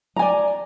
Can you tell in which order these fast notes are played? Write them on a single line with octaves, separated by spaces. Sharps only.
A#5 G#5 D5